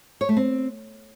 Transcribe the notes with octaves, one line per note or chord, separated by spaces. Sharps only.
C#5
A3
C4